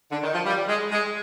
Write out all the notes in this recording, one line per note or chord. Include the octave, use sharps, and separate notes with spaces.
D3
D#3
F3
G3
G#3
G#3